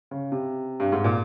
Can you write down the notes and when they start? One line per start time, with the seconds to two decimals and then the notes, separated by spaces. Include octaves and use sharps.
0.11 C#3
0.32 C3
0.80 G2
0.92 G#2
1.04 A#2